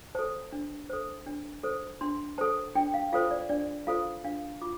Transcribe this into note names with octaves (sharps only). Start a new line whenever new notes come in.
A4 C5 A5
D4
A4 C5
D4
A4 C5
D4 C6
A4 C5 A5
D4 G5
F5
F4 A4 C5 F5
D5
D4 D5
F4 A4 C5 F5
D4 F5
F4 D6